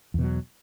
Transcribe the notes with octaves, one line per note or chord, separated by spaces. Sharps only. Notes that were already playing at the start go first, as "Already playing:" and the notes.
E2 B2 F#3